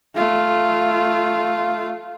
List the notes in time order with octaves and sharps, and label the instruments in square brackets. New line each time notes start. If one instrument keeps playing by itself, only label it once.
[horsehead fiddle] A3 F4